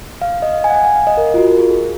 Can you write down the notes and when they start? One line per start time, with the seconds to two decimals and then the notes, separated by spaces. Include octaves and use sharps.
0.22 F5
0.42 D#5
0.53 F5
0.64 G#5
0.70 F#5
0.74 G#5
0.85 F#5
0.95 F5
1.07 D#5
1.17 A#4
1.34 F4
1.38 F#4
1.49 A#4
1.59 G#4
1.70 G#4